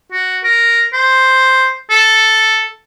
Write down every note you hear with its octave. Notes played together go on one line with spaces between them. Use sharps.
F#4
A#4
C5
A4